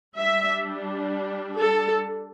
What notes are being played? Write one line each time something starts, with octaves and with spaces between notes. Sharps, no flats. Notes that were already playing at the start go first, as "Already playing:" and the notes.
G3 D4 E5
A4